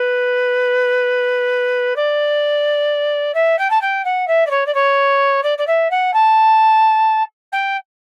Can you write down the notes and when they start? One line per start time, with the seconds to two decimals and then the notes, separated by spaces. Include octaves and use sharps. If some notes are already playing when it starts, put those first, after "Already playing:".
Already playing: B4
1.96 D5
3.34 E5
3.58 G5
3.70 A5
3.81 G5
4.04 F#5
4.27 E5
4.46 D5
4.50 C#5
4.66 D5
4.74 C#5
5.43 D5
5.58 D5
5.67 E5
5.90 F#5
6.13 A5
7.52 G5